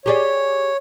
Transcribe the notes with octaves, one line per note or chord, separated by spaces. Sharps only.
G4 G#4 C#5 D5